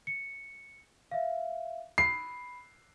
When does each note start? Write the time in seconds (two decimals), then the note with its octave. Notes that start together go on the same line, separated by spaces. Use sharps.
0.07 C#7
1.11 E5 F5
1.98 B5 C7